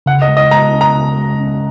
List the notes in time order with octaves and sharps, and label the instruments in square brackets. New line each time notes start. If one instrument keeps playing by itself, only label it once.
[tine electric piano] C#3 [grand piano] F#5
[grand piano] D#5
[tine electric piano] G#3
[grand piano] D#5
[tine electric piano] G#3 [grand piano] A#5
[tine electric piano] C#4
[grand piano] A#5
[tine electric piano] C#3
G#3
C#4